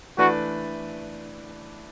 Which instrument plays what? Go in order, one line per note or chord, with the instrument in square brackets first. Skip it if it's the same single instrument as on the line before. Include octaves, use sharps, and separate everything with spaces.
[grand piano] E3 A3 D4 B4 D5 [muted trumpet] F#4